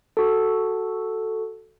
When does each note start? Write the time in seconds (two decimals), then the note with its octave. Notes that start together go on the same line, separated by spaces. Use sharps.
0.17 F#4 A4